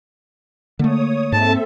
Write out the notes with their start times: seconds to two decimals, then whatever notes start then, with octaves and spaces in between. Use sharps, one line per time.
0.79 D3 A3 A#3 C#5 D#6
1.32 G#2 C4 A4 E5 A5